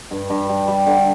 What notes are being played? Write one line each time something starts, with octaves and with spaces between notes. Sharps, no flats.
G2
G2
G3
G3
D3